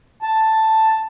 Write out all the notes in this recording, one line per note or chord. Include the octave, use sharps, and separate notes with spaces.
A5